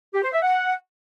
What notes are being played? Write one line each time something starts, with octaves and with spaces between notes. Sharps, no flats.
G4
C5
E5
F#5